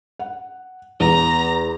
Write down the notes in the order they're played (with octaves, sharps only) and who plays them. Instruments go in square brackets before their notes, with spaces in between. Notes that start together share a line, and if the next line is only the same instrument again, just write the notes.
[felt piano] F#5
[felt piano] E2 [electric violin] A#5